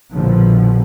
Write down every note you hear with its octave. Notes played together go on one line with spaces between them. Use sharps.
A#1 B2 D3 F3